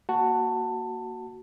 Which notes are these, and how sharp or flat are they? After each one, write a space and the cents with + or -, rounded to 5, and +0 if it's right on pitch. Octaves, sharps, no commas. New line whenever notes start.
A#3 +0 F#4 +0 A5 +15